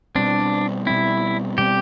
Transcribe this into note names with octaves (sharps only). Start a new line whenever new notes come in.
B2 G3 C4 D4
B2 G3 C4 E4
B2 G3 C4 G4